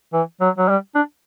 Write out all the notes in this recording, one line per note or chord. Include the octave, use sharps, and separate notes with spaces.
E3
F#3
F#3
G3
D4